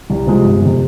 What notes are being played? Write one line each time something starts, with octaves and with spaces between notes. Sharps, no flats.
C2
C3 F3 G#3
G1
F2 C3